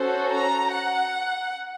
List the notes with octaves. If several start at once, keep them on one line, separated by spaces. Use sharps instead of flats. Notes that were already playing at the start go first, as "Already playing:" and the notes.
Already playing: C#4 F#4 A4 C5
A#5
F#5